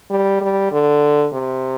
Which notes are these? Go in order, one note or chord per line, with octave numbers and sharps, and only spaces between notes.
G3
G3
D3
C3